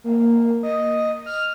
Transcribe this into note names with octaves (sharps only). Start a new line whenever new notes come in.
A#3
D#5
F6